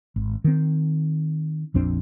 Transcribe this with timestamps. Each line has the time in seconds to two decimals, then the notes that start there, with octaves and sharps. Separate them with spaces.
0.16 G#1
0.44 D#3 C4
1.74 A#1 F2 C4 D4